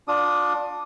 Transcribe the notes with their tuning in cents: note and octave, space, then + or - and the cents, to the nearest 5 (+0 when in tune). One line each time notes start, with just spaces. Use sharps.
D4 +0 F4 +35 D#6 +0